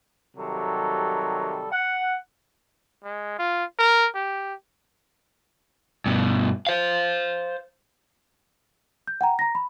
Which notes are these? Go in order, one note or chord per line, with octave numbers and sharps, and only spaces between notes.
C3 D#3 F#3 G3 A4
F#5
G#3
F4
A#4
G4
G2 B2
C5 F5
G6
F#5 G5 A#5
A#5 A#6
B5